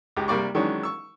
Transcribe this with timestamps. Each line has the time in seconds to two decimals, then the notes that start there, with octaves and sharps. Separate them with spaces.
0.17 C#2 G#3 G4
0.28 C3 G3 A#3 D5 C#6
0.55 D#3 E3 F#3 G#3 C#4 D4
0.83 C#6 E6